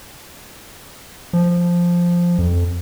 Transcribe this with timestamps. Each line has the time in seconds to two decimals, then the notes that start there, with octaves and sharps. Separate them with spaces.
1.33 F3
2.38 F2